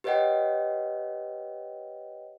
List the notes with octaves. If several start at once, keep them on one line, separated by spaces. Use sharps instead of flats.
G4 B4 C#5 D#5 F#5 G5